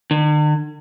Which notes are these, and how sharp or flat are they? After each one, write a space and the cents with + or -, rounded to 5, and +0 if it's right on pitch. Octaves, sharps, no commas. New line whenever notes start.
D3 +45